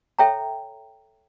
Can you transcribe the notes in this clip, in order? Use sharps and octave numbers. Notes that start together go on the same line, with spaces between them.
A4 C#5 E5 G5 A#5